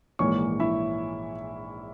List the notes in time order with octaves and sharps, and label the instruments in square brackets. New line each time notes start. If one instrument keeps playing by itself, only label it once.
[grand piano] A#1 G#2 E3 A#3 C#5 C#6
E4 E5